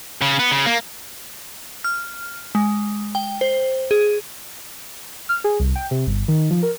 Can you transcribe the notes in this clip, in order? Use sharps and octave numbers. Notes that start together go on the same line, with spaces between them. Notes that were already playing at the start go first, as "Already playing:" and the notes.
C#3
B3
C#3
A#3
F6
G#3
G5
C5
G#4
F6
G#4
C2
G5
C3
G1
D#3
F3
A#4